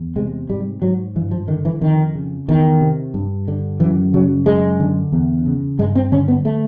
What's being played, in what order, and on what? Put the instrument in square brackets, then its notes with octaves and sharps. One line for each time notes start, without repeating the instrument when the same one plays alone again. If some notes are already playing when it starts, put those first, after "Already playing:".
Already playing: [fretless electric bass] E2
C3 G#3
G#2 G3
G#2 F#3
G2 E3
F3
D3 D#3
E3
F2 D#3
C#3
E2 D#3
C3
G2
D3
F#2 E3
C#3 F#3
F#2 G#3
D3
E2
C#3
G2 G#3
C4
D3 C#4
B3
A3